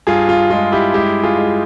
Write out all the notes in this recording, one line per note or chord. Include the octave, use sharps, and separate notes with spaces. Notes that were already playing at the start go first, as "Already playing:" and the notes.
G2 F4 G#4
F4
G#3 F4
E4 G4
G#3 E4 G4
F4 G#4
G#3